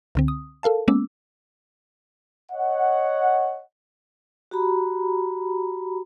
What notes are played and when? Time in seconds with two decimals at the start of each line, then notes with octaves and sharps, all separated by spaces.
0.15 C#2 D3 C4
0.28 D#6
0.63 A4 A#4 F5 A5
0.88 G#3 A#3 B3 C#4 D6 E6
2.50 C#5 D#5 F#5
4.51 F#4 G4 A#5 B5